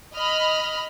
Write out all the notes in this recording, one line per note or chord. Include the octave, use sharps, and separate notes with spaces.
D#5 B5 F6